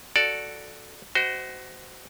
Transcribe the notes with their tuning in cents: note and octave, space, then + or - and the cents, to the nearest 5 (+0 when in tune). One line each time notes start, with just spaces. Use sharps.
F#4 +0 A4 +0 D5 +0
F#4 +20 C5 -20 D#5 +0